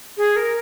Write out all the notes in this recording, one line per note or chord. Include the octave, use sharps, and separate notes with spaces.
G#4
A#4